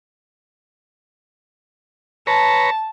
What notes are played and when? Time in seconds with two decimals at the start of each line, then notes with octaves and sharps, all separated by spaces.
2.27 B4 C#5 A5 A#5